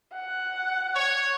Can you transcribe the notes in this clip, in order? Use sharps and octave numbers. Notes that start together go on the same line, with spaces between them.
F#5
C#5